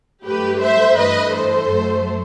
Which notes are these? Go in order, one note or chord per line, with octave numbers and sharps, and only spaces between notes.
G2 F#3 A3 G4 B4
C5 E5
G2 E3 A3 B4 D#5
A4 C5
F#2 F#3 A3